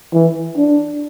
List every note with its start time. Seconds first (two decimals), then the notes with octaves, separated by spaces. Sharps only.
0.13 E3
0.57 D4